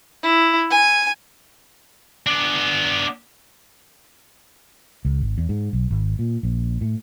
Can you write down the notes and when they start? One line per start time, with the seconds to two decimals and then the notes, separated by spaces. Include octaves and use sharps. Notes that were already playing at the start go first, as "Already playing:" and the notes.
0.23 E4
0.71 G#5
2.27 B3 D4
5.05 C#2
5.21 G#1
5.38 E2
5.49 G#2
5.73 B1
5.91 G#1
6.19 A#2
6.43 A#1
6.81 A2